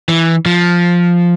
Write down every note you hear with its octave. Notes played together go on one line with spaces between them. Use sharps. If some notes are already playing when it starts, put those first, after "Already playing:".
E3
F3